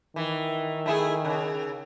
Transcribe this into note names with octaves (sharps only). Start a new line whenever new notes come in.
D#3 E3
A3 E4 G#4
C#3